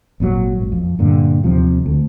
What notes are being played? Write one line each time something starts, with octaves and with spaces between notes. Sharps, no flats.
G#1 A#2 D3 F#3
G#1
F2
G2 A#2 D3
D#2 C3 F3
D2